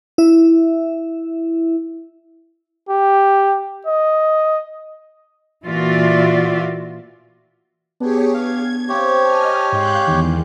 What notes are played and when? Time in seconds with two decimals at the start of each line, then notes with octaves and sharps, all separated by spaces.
0.18 E4 E5
2.89 G4
3.86 D#5
5.66 A#2 E3 F4 F#4 D5 E5
8.00 B3 D4 G4 G#4 C#5
8.34 F5 G#6
8.89 C3 C4 G4 C#5 F5
9.25 D5 D#5 G#5 A5 F6
9.72 G#2 G#3 F5 G5 D6 F#6 G6
10.07 E2 D#3